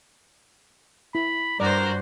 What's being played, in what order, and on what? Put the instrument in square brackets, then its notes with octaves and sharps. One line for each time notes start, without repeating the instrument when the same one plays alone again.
[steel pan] E4 [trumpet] B5
[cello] G2 [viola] F#4 C5 [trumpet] A#4 [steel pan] D5